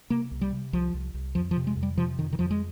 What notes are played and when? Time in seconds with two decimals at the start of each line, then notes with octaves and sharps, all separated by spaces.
0.10 C3 A#3
0.31 C2
0.41 G3
0.52 C3
0.73 C2 F3
0.94 C2
1.14 C2
1.35 F2 F3
1.51 F3
1.56 C3
1.67 G#3
1.76 F2
1.83 G3
1.97 C3 F3
2.18 F2 D#3
2.33 D#3
2.39 F2 F3
2.51 G#3